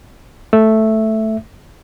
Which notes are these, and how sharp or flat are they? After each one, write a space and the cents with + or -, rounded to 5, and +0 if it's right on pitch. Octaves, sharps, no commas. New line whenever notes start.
A3 +0 E5 +0